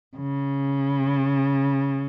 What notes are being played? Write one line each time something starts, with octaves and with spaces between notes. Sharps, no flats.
C#3